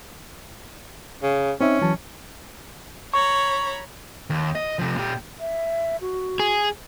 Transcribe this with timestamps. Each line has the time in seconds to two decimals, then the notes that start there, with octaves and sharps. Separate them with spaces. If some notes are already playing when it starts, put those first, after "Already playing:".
1.23 C#3
1.61 C4 C#4 D#4 E5
1.82 E3 F#3 A5
3.14 C#5 A#5 B5 C#6
4.30 D#2
4.55 D#5
4.79 C3 F3
4.96 A#2 G4
5.39 E5
6.01 F#4
6.40 G#4